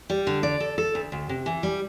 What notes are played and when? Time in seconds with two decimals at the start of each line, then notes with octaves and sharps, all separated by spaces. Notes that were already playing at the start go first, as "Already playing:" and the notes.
0.10 G3
0.27 D3
0.43 D5
0.60 A4
0.78 A4
0.95 D2
1.12 D2
1.29 C3
1.46 E3
1.63 G3